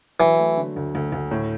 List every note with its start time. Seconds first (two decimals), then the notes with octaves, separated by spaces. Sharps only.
0.20 E3 F#3
0.39 A3
0.57 D3
0.76 D2
0.95 D2
1.12 D2
1.31 A2